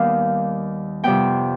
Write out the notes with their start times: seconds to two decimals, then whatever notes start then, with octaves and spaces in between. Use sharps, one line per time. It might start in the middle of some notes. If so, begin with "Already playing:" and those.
Already playing: D#2 D#3 G3 B3 F5
1.04 F2 C3 G3 B3 G5